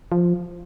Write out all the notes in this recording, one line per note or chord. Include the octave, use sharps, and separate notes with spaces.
F3